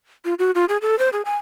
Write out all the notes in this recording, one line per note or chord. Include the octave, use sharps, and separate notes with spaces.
F4
F#4
F4
G#4
A4
C5
G#4
G#5